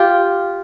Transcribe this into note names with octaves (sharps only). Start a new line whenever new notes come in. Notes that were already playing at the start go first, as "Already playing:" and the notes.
Already playing: F4 G4